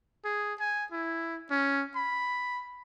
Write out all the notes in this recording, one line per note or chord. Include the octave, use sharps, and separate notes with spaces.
G#4
G#5
E4
C#4
B5